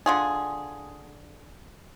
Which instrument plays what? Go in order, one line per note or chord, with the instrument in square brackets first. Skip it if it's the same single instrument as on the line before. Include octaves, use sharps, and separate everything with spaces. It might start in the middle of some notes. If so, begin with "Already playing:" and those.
[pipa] D3 F4 G#4